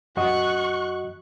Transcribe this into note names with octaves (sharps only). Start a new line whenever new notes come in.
F#2 F#4 D#5 C#6 F#6